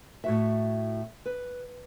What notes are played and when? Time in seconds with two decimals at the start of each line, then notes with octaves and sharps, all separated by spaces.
0.24 A2 F#4 E5
1.26 B4